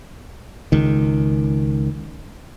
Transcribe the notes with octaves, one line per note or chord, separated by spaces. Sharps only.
C#2 D#3